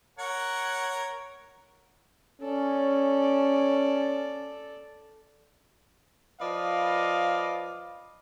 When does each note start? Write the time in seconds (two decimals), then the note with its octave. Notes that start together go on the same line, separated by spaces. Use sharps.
0.19 A#4 C#5 F#5
2.41 C#4 A4 D5
6.41 F3 B4 D5 D#5 F5